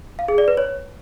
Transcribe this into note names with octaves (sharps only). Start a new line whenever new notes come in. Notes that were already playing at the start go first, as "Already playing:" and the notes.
F5
G#4
D5
B4
C#5